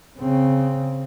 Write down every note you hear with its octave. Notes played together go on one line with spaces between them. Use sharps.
C#3 C4